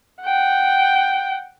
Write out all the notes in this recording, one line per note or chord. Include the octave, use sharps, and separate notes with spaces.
F#5 G5